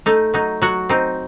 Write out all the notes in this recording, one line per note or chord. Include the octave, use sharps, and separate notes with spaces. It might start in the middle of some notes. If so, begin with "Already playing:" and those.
A3 D#4
F#3 D#4
F#3 F#4
C4 D#4